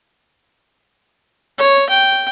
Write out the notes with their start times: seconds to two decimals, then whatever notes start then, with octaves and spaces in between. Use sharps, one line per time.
1.58 C#5
1.89 G5